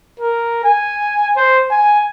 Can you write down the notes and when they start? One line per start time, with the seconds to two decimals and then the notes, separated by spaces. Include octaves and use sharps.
0.20 A#4
0.64 G#5
1.36 C5
1.70 G#5